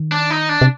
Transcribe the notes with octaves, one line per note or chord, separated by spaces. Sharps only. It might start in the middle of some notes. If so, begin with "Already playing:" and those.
Already playing: D#3
D4
D#4
D4
C3